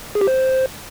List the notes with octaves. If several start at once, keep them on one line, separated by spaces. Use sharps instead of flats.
G#4
G4
C5